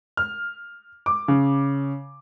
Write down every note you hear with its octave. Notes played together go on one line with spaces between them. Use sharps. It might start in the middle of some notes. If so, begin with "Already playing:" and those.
F6
D6
C#3